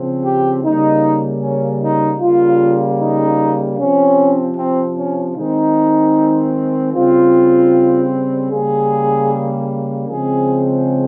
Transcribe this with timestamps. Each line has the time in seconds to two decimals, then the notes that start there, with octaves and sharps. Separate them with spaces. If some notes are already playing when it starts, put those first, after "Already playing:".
Already playing: C#3 F3 C4
0.24 G4
0.63 C#3 G3 A#3 D#4
1.41 C#4
1.82 D#4
2.20 C#3 G3 A#3 F4
3.00 D#4
3.78 C3 F3 C4 C#4
4.56 C4
4.96 C#4
5.35 D#3 G#3 C4 D#4
6.93 C#3 G3 C4 F4
8.50 C#3 G3 A#3 G#4
10.08 C#3 F3 G#3 C4 G#4